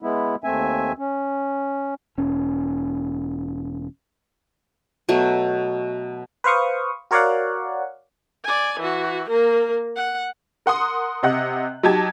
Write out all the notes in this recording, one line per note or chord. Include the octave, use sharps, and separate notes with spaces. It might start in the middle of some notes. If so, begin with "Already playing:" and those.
G#3 B3 E4
D#2 A3 C4 E5 G#5
C#4
E1 C#4
B2 F#3 A3
B4 C5 F5 C#6 D#6
F#4 A#4 C#5 D5 F5 F#5
D5 G#5
E3 F#4
A#3 A#4
F#5
A#4 F#5 C6 D#6
C3 D#5 F#5 F#6
F#3 D#4 G4 A5 G#6